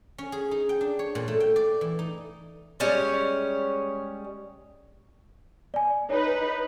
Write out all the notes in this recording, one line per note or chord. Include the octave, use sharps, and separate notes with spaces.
C#4
G#4
D#4
G5
D4
C#5
A#2
A3
G5
D5
E3
D#4
G3 G#3 C#4
D5 G#5
D#4 B4 C#5